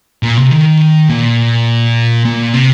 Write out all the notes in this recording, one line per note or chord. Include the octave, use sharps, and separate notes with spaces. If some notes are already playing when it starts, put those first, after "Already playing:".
A#2
C3
D#3
A#2
A#2
C3